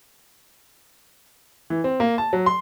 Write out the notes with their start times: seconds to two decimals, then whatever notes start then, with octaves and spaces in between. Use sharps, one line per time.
1.70 E3
1.84 C4
2.00 A#3
2.18 A5
2.33 F#3
2.46 C6